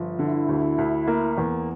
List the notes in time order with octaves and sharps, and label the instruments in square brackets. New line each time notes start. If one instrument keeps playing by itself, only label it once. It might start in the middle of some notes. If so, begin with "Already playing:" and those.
Already playing: [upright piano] G1 F3
[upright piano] D3 [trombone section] E4
[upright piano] D2
D2
A#3
E2